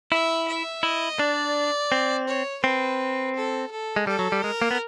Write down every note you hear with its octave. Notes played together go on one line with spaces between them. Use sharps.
E4 E5
E5
E4 D#5
D4 D5
C4
C#5
C4 B4
A4
A4
G#3
G3 A4
F#3
G3
G#3 A#4
A#3
B3